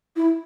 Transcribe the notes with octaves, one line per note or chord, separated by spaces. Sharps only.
E4